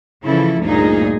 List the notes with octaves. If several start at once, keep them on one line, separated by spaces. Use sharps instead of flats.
C#3 E3 F3 E4 A4
D2 G2 A#2 D#4 G#4